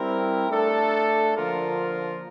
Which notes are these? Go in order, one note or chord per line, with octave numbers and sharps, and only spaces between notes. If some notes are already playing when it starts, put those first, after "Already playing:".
Already playing: G3 C4 E4 A#4
A3 D4 A4
D3 F3 A#3 F4 A#4